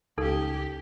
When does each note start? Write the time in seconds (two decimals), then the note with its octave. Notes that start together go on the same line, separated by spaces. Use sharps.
0.18 C#2 C#4 D#4 G4 A4